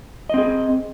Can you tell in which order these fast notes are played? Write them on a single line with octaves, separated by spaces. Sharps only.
D#5 C4 G#4